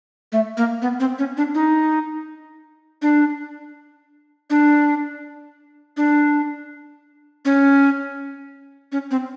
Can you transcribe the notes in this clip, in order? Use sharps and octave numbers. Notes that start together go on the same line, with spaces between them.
A3
A#3
B3
C4
C#4
D4
D#4
D4
D4
D4
C#4
C#4
C4